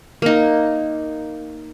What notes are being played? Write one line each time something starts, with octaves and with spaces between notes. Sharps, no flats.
A#3 D#4